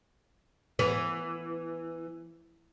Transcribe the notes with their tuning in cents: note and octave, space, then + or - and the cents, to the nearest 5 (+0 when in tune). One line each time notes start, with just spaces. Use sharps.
E3 +10 B3 +0